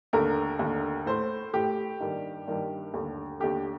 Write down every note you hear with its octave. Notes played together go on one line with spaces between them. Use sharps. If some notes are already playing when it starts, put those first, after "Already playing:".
D#2 D3 A3 A#4
D#2 D3 A3
A2 A3 C5
A2 A3 G4
G2 D#3 G3 A#3
G2 D#3 G3 A#3
D#2 D3 A3
D#2 D3 A3 G4